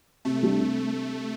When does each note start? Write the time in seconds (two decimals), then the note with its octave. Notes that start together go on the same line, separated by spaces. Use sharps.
0.25 C3 A3
0.43 G3 D4
0.59 C3